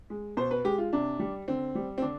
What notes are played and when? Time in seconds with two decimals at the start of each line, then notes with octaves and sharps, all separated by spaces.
0.10 G#3
0.37 B2 C5
0.51 B4
0.65 G#3 G4
0.78 F4
0.93 C3 D4
1.19 G3
1.48 D3 C4
1.75 G3
1.98 C4
2.02 D3 D4